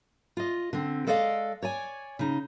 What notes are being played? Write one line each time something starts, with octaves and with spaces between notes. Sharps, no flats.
F4 D#5
D3 C4
G#3 A4 D5 D#5 F5
C#5 D5 G#5
C#3 D#4